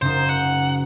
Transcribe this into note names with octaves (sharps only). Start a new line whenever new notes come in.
F#1 D#4 C5
F#5